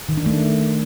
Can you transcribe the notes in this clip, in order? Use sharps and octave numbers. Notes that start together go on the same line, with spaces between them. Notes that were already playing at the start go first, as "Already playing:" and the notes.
D#3
D4
A3